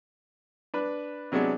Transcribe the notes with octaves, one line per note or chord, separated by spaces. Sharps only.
D4 B4
C3 F#3 G#3 B3 D4